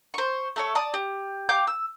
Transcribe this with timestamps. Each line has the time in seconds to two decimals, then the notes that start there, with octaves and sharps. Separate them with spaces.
0.14 C5 C#6
0.56 A3 A4 C#5
0.75 D5 A5 D#6
0.94 G4
1.49 G4 F5 D6 G6
1.67 E6